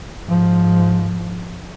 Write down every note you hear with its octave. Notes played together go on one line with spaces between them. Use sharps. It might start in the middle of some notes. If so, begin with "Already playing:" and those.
G#2 F3